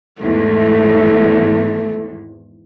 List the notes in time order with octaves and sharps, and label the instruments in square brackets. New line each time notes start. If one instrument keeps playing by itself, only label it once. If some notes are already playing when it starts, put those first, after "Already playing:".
[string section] G#1 E2 G#2 [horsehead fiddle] A3